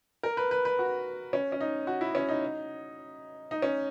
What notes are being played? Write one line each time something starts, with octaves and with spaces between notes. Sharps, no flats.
A#4
B4
B4
B4
F#4
C#4
C#4
D#4
F#4
E4
C#4
D#4
D#4
C#4